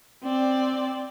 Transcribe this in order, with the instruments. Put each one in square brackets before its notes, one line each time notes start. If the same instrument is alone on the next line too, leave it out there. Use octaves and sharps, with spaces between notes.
[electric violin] C4 D5